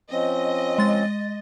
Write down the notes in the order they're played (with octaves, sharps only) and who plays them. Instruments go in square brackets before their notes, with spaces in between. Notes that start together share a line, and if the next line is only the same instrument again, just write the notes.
[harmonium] F3 C4 C#4 [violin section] D#5
[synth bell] G#3 A6